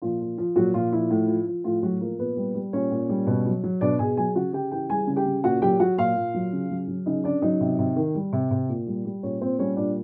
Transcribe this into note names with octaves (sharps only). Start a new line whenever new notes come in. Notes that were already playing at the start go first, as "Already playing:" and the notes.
A#2 F3 F4
F3
F3
A#2 F#3 F#4
A#2 F3 F4
F3 E4
A2
F3
F3
A2 F3 F4
A2 F#3 F#4
F3 A#3 A#4
A#2 B3 B4
G3
G3
A#2 C#4 C#5
A#2
G3
B2
F#3
F#3
B2 D4 D5
B2 G#4 G#5
F#3 G#4 G#5
C#3 F#4 F#5
C#3 G4 G5
E3 G4 G5
G3 G#4 G#5
C#3
G4 G5
C#3
A#2 F#4 F#5
F#3 G4 G5
F#3 F#4 F#5
A#2 F4 F5
A#2
F#3
C#3
F#3
F#3
C#3 D#4 D#5
C#3 D4 D5
F#3 D#4 D#5
C3
C3
D#3
G3
C3
C3
A#2
G3
G3
A#2 C#4 C#5
A#2 C4 C5
G3 C#4 C#5
A#2 D4 D5